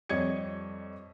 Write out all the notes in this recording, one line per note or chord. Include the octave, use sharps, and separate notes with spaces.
F2 G3 C#5 D#5 G#6 C#7